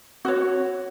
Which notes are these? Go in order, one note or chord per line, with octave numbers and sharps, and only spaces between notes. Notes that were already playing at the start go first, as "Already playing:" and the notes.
F#4 C#5